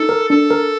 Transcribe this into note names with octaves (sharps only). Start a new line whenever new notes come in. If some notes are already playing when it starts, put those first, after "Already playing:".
Already playing: D#4 A4
A#4
D4 A4
A#4